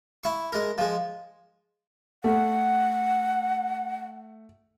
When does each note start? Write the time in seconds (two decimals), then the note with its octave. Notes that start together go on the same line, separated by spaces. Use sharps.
0.24 E4 C#6
0.52 G#3 A#4
0.78 F3 G#3
2.24 A3 F#5